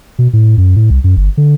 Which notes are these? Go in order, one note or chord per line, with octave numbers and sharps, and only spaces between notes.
B2
A2
F#2
A2
C2
F#2
G1
D3